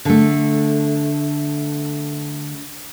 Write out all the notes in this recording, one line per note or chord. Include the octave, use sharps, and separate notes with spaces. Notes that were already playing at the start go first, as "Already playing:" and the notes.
D3 A3